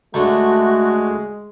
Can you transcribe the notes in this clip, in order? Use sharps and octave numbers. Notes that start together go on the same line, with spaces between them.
D2 D3 G#3 A3 F#4